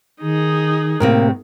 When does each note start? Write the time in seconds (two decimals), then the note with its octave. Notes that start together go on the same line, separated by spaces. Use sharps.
0.22 D#3 D#4 G#4
1.00 A2 C3 A#3 C4 A#4